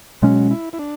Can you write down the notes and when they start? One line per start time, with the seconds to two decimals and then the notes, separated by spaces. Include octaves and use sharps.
0.22 B2 F#3 G#3 C#4
0.51 E4
0.73 E4
0.79 D4